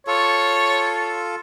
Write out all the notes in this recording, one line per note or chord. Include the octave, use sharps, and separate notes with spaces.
F4 A4 C#5